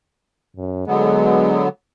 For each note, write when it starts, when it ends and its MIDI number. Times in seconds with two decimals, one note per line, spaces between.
0.57 0.84 42
0.87 1.68 50
0.87 1.68 54
0.87 1.64 56
0.87 1.68 59